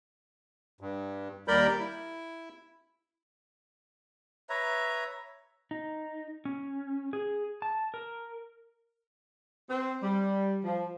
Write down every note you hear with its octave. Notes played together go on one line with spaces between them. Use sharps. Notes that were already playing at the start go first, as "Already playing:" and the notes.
G2
D#2 G3 A#4 D5 B5 G6
E4
B4 C#5 E5 A#5
D#4
C#4
G#4
A5
A#4
C4
G3
F3